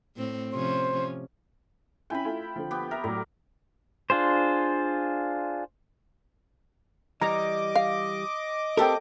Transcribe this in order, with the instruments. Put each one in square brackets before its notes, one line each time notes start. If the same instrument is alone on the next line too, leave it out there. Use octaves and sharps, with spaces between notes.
[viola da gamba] A2 C4
[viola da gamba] C3 F3 C#4 [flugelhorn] C5
[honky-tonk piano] C#4 E4 G#5 [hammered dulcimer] G5 B5
[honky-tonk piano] A3 E4 F4
D3 F3
[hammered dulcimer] B3 G4
[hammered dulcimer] A#4 [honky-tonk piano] E5
[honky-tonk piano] A2 F#3 [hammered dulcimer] D5
[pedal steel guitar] D4 F4 G#4 C5
[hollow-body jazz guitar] E3 G3 [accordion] D#5 D6 [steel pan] A#5
[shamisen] F5
[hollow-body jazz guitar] C4 G4 A#4 [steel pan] A4 G5